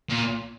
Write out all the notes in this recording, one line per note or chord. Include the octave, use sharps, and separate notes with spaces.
A#2